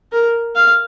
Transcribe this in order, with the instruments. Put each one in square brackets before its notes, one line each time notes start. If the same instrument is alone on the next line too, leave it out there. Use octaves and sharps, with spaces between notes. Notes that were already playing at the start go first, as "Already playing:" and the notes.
[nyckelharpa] A#4
F5